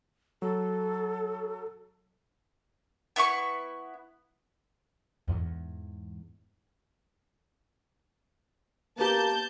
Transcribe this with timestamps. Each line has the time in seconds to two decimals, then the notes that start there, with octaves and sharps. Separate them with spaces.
0.42 F#3 A4
3.16 B3 E4 C6 C#6
5.28 E2 G#2
8.98 A#3 B3 G4 A5 G6